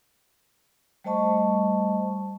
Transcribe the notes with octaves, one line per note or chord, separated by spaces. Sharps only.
G3 A3 C5 D#5 A5 C#6